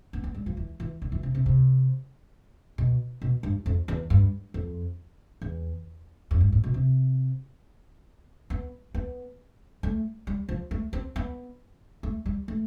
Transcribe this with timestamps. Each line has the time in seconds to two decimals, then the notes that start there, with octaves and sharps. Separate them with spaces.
0.13 B3
0.24 B3
0.34 G3
0.46 F3
0.57 E3
0.80 E3
1.02 D3
1.12 E3
1.23 C3
1.35 C3
1.46 C3
2.78 B2
3.22 B2
3.43 G2
3.66 F2
3.88 E2
4.10 G2
4.54 F2
5.42 E2
6.31 F2
6.41 G2
6.52 A2
6.64 B2
6.74 C3
8.50 B3
8.94 B3
9.83 A3
10.27 G3
10.49 F3
10.71 A3
10.93 C4
11.16 B3
12.03 A3
12.26 G3
12.48 A3